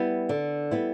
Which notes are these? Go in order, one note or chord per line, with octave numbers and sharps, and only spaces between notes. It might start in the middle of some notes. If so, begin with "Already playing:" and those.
Already playing: G3 B3 E4
D3
G3 B3 E4